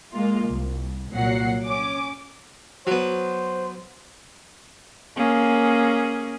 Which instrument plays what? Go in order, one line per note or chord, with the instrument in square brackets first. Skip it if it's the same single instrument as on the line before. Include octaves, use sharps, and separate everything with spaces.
[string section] G#3 A#3 F4
C2
C2 A#2 F#3 F#5 C7
C#4 D6
[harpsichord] F#3 B3 [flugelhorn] C5
[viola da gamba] A#3 C#4 G#4